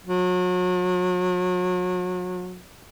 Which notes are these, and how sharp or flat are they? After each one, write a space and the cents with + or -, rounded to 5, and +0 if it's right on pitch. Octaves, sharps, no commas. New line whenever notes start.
F#3 -35